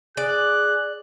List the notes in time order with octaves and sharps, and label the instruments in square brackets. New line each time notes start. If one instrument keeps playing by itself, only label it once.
[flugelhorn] G#4 [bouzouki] D5 [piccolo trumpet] F#6